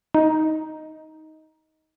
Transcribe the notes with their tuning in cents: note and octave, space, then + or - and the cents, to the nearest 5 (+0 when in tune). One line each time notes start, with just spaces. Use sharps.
D#4 +10